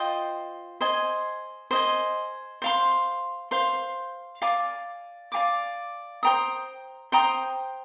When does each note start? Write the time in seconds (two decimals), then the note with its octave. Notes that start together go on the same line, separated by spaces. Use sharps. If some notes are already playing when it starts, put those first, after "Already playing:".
Already playing: F4 C5 D#5 G5
0.81 C5 D#5 G#5
1.71 C5 D#5 G#5
2.62 C5 F5 C6
3.51 C5 F5 C6
4.42 D5 F5 G#5 D6
5.32 D5 F5 G#5 D6
6.23 C5 G5 A#5 D#6
7.12 C5 G5 A#5 D#6